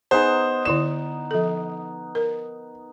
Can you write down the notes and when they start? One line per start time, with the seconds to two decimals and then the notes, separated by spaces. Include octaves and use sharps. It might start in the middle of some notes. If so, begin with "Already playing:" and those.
0.11 B3 D#4 G#4 C5 G#5
0.65 D3 E4 D5 E7
1.31 F3 A4
2.15 A#4